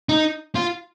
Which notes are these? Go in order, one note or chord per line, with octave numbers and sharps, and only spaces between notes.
D#4
F4